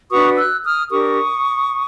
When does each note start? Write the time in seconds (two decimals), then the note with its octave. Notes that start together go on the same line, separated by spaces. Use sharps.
0.10 D4 F#4 B4 C#6 D#6
0.37 E6 F#6
0.63 D#6 F6
0.90 D4 G4 A#4 C#6 D#6